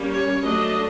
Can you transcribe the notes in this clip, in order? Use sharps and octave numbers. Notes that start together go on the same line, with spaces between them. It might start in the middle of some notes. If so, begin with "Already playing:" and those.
Already playing: G3 A#3 C#4
C#5
F#3 A3 D4 D#5